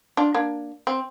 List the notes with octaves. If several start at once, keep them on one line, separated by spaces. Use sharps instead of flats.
D4 F4
A#3 D4
C4